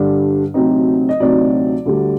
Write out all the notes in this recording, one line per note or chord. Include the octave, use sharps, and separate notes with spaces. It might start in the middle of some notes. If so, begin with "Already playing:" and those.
Already playing: G2 D3 G3 D4
D2 C3 F#3 C4 D#4
D#5
D2 C3 F#3 C4 D#4 D5
D2 D3 G3